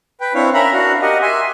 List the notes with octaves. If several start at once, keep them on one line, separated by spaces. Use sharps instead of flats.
B4 G5
C4 D4 E4 C#5 F5
C#4 A#4 E5 A#5 B5
D4 F#4 F5
G4 A#4 D#5 F#5
E5 G#5 C6